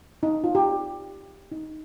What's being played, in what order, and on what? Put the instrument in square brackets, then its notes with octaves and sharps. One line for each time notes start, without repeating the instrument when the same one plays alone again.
[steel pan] D#4
F4
G4
D#4